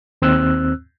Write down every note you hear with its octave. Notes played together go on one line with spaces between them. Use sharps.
D#2 C4 E6 F#6